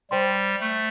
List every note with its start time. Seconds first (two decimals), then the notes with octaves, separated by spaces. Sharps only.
0.11 G3 C5 G5 C6
0.60 A3